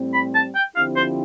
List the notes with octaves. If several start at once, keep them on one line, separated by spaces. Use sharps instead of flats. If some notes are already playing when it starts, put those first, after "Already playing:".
Already playing: A2 G3 C4
B5
A5
G5
D3 F3 C4 E4 G4 F5
C5